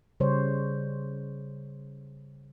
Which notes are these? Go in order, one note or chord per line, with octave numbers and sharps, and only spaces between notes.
C#3 G3 C5 C#5